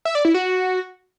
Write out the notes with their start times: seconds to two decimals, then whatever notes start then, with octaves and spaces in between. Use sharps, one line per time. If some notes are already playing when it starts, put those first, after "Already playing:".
0.05 E5
0.15 D5
0.25 E4
0.34 F#4